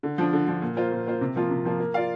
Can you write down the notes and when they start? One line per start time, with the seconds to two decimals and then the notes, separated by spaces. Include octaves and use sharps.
0.03 D3
0.18 F3 D4
0.33 D3
0.47 F3 D4
0.62 A#2
0.76 A#3 F4 C5
0.92 A#2
1.07 A#3 F4 C5
1.21 C3
1.36 F3 A#3 F4
1.50 C3
1.65 F3 A#3 F4
1.80 A#3
1.94 F4 D5 F5